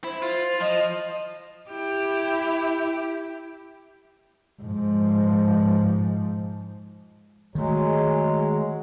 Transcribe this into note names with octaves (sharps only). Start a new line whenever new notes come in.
E4 C5
F4
F3 D#5
E4 G4
G#2 F3
D#3 F#3 G#3 A3